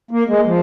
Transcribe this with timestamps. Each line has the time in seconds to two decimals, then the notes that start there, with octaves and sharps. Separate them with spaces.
0.11 A#3
0.28 G#3
0.46 F3